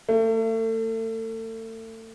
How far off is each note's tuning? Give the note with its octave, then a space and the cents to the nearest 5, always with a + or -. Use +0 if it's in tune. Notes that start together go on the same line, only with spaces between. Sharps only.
A3 +35